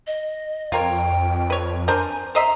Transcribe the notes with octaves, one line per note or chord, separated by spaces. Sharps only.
D#5
F2 F4 A#4 C#5 G5
B4 C#5
D4 A#4 C5 G#5
C5 D#5 E5 A#5